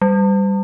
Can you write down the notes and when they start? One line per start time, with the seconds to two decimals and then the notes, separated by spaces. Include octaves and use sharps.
0.01 G3